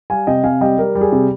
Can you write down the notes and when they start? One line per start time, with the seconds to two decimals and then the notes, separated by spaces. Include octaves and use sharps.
0.10 G3 F5 G#5
0.27 C3 D#5 G5
0.43 C3 F5 G#5
0.61 G3 D#5 G5
0.78 G3 A#4
0.95 G3
1.01 G#4
1.12 C3